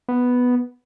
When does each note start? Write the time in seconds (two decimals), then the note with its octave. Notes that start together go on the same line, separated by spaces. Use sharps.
0.08 B3